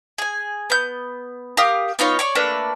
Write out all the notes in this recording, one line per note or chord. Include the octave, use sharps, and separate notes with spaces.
G#4 G#5
B3 G6
G4 A#4 F5 D#6
B3 D#4 F4 C#5
C#5 D5 C#6
A3 A#3 D4 B4